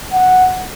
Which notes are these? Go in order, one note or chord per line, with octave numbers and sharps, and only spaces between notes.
F#5